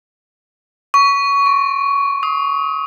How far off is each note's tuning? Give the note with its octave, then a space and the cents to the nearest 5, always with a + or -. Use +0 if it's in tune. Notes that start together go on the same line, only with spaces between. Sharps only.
C#6 +20
C#6 -45
D#6 +35